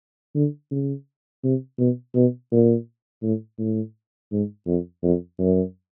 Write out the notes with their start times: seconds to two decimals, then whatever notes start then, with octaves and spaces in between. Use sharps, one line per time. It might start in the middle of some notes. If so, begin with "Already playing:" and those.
0.35 D3
0.71 C#3
1.44 C3
1.79 B2
2.15 B2
2.52 A#2
3.23 A2
3.59 A2
4.32 G#2
4.67 F2
5.03 F2
5.39 F#2